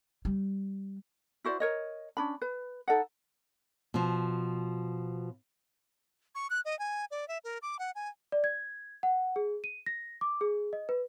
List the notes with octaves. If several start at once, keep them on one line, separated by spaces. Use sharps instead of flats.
G3
E4 F#4 C5 D5
A#4 C#5 D#5
C#4 D4 B5
B4
D#4 A4 D#5 F#5
B2 F3
C#6
F#6
D#5
G#5
D5
E5
A#4
D6
F#5
G#5
D5
G#6
F#5
G#4
D#7
A#6
D6
G#4
D#5
B4